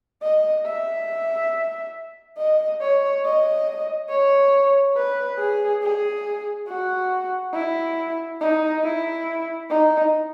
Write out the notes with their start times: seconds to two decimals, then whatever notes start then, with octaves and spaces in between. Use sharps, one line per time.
0.23 D#5
0.66 E5
2.38 D#5
2.81 C#5
3.24 D#5
4.10 C#5
4.96 B4
5.38 G#4
5.83 G#4
6.68 F#4
7.54 E4
8.41 D#4
8.83 E4
9.69 D#4